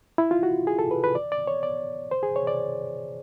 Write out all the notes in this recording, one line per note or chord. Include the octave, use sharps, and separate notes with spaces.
E4
F4
F#4
G#4
A4
B4
B4
D5
D5
C#5
D5
C5
G#4
C#5
D5